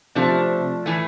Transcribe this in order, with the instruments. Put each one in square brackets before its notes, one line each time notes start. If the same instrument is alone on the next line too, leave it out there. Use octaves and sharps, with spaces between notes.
[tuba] C3 [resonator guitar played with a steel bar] F3 A3 D4
[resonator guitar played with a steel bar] A2 E3 A3